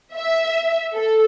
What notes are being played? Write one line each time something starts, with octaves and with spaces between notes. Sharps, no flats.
E5
A4